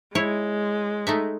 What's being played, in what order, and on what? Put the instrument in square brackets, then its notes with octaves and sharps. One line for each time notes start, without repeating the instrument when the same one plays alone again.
[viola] G#3 [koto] E4 C#5
[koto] A3 D#4 E5